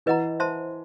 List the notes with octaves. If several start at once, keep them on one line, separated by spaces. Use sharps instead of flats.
E3 B4 D#5 F#5 A#5
C5 E5 A5 C6